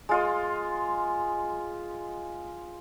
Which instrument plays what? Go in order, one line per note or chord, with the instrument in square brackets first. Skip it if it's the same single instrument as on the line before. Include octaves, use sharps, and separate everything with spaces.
[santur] G#3 F4 D#5